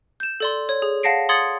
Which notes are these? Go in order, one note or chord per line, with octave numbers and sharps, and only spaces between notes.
G6 E7
A4 D5 C6
C#5
G#4
F5 F#5 A5 A#6 C7 D7
C6 D#6 G#6 A6 C#7 F#7